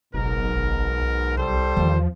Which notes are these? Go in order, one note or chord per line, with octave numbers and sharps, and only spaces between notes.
F#1 B1 G#2 B2 A#4
G1
B1
C2 G3 A4 C5
E2 D#3 F3 B3